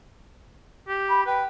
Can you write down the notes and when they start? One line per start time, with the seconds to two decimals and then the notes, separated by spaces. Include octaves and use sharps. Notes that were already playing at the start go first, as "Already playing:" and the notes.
0.88 G4
1.09 B5
1.26 B4 G5